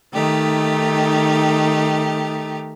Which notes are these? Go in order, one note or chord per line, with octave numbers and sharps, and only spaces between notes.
D#3 A3 D#4 G4